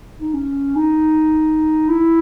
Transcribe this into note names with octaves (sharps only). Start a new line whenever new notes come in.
D#4
C#4
D#4
E4